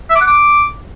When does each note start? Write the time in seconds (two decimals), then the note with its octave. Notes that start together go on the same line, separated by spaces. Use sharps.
0.10 E5
0.15 D6
0.21 F#5
0.26 D6